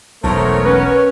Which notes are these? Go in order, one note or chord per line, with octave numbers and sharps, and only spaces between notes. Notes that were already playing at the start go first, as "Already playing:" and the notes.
E1 B1 A3 B3 A#4 C5 C#5
C#4 B4